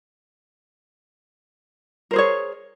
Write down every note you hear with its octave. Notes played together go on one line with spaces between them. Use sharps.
G#4 A#4 C5 C#5